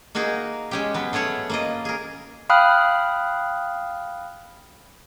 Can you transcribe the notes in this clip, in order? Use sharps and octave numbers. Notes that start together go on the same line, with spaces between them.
A#3 D#4 F#4 G#4 A#4
G#3 C#4 G4
F#3 B3
A3 C#4 G#4 C#5 F#5
A#3 F4 D#5
G#4 A#4
F5 G5 B5 D#6 F6 F#6